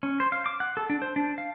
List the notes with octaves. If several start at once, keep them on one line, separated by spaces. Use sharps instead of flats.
C#4
C5
F5
D6
F#5
A4
D4
C5
D4
F5